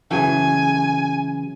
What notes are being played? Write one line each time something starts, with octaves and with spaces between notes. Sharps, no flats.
C#3 E3 F#3 G#5